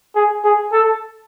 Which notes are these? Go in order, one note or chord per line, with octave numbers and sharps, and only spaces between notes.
G#4
G#4
A4